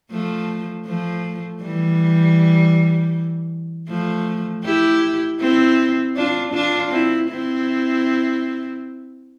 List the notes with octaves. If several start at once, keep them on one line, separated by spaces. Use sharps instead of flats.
F3 A3
F3 A3
E3 G3
F3 A3
E4 G4
C4 E4
D4 F4
D4 F4
C4 E4
C4 E4